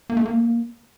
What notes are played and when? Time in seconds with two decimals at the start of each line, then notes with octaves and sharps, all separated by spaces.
0.10 A#3
0.17 A3
0.26 A#3